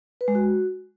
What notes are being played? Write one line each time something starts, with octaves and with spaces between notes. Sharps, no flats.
B4
G#3
F#4